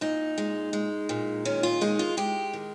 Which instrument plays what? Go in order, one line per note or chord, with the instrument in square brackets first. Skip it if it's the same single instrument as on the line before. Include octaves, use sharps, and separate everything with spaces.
[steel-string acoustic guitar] A#2 D#4
G#3
G#3
A#2
D#3 C#4
F4
G#3 D#4
F4
G#3 G4
D#3